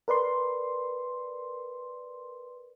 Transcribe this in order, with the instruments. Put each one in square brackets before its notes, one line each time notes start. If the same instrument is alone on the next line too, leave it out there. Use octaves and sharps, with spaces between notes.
[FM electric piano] A#4 B4 D5 C6